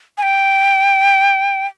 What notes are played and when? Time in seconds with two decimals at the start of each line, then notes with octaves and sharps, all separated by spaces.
0.18 G#5
0.23 G5